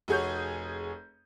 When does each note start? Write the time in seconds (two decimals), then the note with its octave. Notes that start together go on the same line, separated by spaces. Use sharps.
0.08 F1 F#4 G#4 C#5 G6